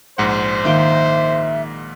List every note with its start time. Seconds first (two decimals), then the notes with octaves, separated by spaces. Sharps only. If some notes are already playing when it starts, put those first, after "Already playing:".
0.18 A#1 G#2 C5 F#5
0.65 D#3 A#3 E5 G5